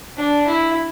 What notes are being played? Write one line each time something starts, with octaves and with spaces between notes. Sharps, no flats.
D4
E4